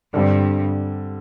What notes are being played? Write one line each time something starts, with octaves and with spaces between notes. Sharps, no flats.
G2 D3 G3 C4